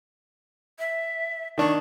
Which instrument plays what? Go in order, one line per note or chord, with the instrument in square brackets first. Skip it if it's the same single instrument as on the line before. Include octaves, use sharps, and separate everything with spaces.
[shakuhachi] E5
[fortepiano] D#3 D4 [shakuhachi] C#6